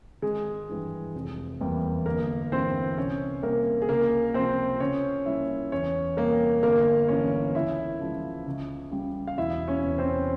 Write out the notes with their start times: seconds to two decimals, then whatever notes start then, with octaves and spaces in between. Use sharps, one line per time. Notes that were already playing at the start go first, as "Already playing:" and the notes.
0.22 G#1 G#3 G#4
0.69 G2 E3 G3
1.15 F1
1.60 E2 C3 G3 A#3
2.05 G1 A#3 A#4
2.52 G2 E3 G#3 C4 C5
2.97 C2 C#4 C#5
3.43 C3 G3 A#3 A#4
3.82 G#4
3.89 C#2 A#3 A#4
4.34 C3 F3 C4 C5
4.80 C#2 C#4 C#5
5.26 C#3 G3 A#3 E4 E5
5.72 E2 C#4 C#5
6.17 C3 G3 A#3 A#4
6.63 G1 A#3 A#4
7.08 G2 E3 C#4 C#5
7.55 C#2 E4 E5
8.00 C#3 F3 G#3
8.47 C#2
8.91 C#3 G3
9.27 F5
9.38 E1 E4 E5
9.68 C#4 C#5
9.84 E2 C3
9.98 C4 C5